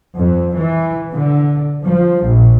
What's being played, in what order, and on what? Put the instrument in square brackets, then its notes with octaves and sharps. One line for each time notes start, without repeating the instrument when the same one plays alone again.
[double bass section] F2
E3
D3
F3
A#1